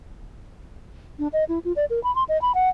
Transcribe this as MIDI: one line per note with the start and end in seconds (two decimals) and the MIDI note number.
1.19 1.28 62
1.33 1.44 75
1.49 1.59 64
1.65 1.72 65
1.76 1.85 74
1.90 2.02 70
2.04 2.14 83
2.15 2.23 84
2.29 2.40 75
2.42 2.52 83
2.55 2.69 78